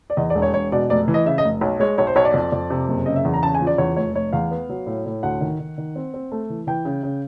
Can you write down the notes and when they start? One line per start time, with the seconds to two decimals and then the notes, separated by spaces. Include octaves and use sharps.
0.10 D5
0.17 E2 D#5
0.30 D5
0.35 E1
0.42 C#5
0.54 E1 C#5
0.72 B2 D5
0.90 F1 D5
1.08 E3
1.14 D#5
1.26 C#3 E5
1.38 D#5
1.45 F1
1.61 B1
1.80 G#3 C#5
1.98 B1 C#5
2.07 C5
2.16 B1 C#5
2.25 D5
2.34 F2
2.52 F2
2.70 C3
2.88 F#1
3.06 C#3 D#5
3.16 E5
3.25 E2
3.34 A#5
3.42 C#3 A5
3.55 G#5
3.61 F3
3.67 D5
3.78 E2 C#5
3.96 F1 C#5
4.15 F1 C#5
4.33 E2 F5
4.51 B3
4.69 F#3
4.87 A2
5.06 A2
5.23 D2 F#5
5.41 D#3
5.60 D#3
5.78 D#3
5.96 C4
6.14 C4
6.32 A3
6.50 E3
6.67 E3 G5
6.85 C#3
7.03 C#3